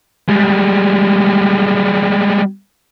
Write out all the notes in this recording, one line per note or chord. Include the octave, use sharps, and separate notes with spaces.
G3 G#3